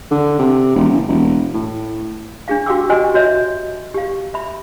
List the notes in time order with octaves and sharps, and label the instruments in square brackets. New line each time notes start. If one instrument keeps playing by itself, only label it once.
[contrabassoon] D3
C3
E1
F#1
E1
A2
[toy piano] D4 G#4 F5
F#4 G4 F5 G5 D6 E6
F#4 G4 C5 D#5 F#5 G#5
F#4 C#5 D#5 E5
G4 F5
E5 B5